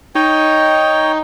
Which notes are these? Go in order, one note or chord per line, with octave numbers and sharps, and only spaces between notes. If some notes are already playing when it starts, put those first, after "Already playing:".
D#4 C#5 G5